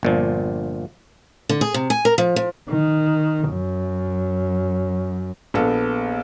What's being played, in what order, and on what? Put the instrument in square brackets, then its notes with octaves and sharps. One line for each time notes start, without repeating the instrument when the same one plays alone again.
[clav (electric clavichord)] G1 A#2 F3
[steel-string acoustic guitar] D3
G#4
C3
G#5
A#4
F3
F3
[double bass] D#3
F#2
[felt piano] A#1 B3 A4